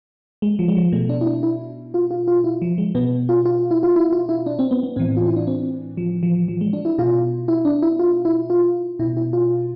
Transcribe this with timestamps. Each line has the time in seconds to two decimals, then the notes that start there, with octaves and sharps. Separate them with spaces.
0.42 G#3
0.59 F3
0.68 G#3
0.77 F3
0.92 B2 A3
1.09 D4
1.21 E4
1.27 D4
1.43 E4
1.94 F4
2.11 F4
2.28 F4
2.44 E4
2.62 F3
2.78 G#3
2.95 B2 B3
3.29 F4
3.45 F4
3.71 E4
3.83 F4
3.96 E4
4.12 F4
4.29 E4
4.46 D4
4.59 C4
4.71 B3
4.83 B3
4.96 A2 E3 C4
5.17 F4
5.26 E4
5.36 D4
5.47 C4
5.97 F3
6.23 F3
6.48 F3
6.61 G#3
6.73 D4
6.85 E4
6.98 B2 F4
7.48 E4
7.65 D4
7.82 E4
7.99 F4
8.25 E4
8.50 F4
8.99 B2 E4
9.17 E4
9.33 F4